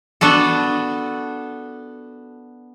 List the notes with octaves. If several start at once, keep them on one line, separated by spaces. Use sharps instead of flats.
B3 D4 F#4 A4